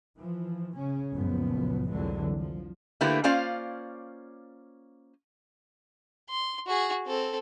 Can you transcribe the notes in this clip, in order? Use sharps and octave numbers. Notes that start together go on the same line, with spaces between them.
E3 F3
C#3 C#4
F#1 C#2 F#2 A#2 F3 B3
C2 F2 D3 E3 F#3 G#3
F3
D3 A3 A#3 E4 G4 B4
A#3 C#4 F4 C5 D5 F5
C6
F#4 G#4
C4 A4